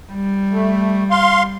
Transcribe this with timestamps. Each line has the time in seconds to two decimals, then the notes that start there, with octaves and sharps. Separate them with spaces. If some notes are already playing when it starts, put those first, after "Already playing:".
0.11 G3
0.51 A3
1.11 F5 C6